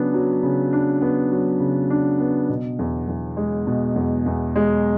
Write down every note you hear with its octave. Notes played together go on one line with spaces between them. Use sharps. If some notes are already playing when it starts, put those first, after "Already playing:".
Already playing: C#3 F#3 B3 D4
F#3
C#3
D4
B3
F#3
C#3
D4
B3
B2
E2
E2
G#3
B2
E2
E2
G#3